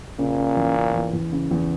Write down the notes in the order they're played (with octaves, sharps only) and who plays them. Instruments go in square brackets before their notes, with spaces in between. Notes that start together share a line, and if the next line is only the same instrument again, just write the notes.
[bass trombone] A#2 [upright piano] C#3
[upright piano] C#3
E2
C#3
E2
E2
C#3
E2